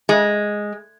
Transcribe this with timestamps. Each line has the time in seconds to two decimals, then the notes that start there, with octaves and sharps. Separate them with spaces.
0.09 G#3